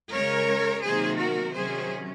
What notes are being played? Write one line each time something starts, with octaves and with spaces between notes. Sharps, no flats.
C#3 G#3 C#4 A#4 C#5
C3 D#3 F#3 A#3 D#4 G#4 C5
F#4 A#4
C3 D#3 F#3 C#4 G#4 C5